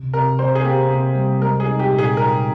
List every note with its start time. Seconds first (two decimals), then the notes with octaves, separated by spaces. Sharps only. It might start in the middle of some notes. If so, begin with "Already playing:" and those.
Already playing: C3
0.14 C3 A#4
0.39 C3 C5
0.55 G#4
0.65 A#3 G4
0.91 C3
1.15 G3
1.42 G#3 A#4
1.60 G#4
1.67 D#4
1.79 G4
1.92 A#2
1.98 G#4
2.17 D#4 A#4